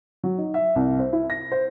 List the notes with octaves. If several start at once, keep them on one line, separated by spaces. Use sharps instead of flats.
F#3
D#4
E5
C2
C5
E4
A#6
C5